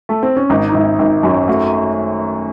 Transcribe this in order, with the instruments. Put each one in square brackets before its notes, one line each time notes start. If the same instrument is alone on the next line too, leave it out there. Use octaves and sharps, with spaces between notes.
[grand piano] A3
C4
C#4
[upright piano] G#1 [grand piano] D#4
[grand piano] D#4
[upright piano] G#1 [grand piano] E4
[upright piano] G#1
[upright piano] F#2 [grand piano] F#4
[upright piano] A3 [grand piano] F#4